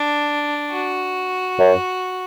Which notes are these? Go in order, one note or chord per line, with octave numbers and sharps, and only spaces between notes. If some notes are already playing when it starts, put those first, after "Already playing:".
Already playing: D4
F#4
F#2